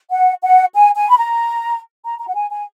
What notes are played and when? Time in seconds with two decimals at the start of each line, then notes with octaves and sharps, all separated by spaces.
0.10 F#5
0.41 F#5
0.74 G#5
0.95 G#5
1.09 B5
1.17 A#5
2.03 A#5
2.19 A#5
2.27 F#5
2.35 G#5
2.51 G#5